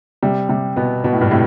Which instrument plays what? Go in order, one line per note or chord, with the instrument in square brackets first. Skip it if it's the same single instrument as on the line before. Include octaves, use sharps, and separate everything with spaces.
[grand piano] C3 [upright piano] G3
[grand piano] C3 [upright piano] G3
[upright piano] B2 [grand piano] B3
[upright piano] B2 [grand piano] B3
[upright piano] A2
G2
[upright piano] A2 [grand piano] C3